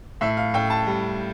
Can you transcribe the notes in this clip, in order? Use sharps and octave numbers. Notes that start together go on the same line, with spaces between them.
A2 E5
F5
A2 G5
A5
G3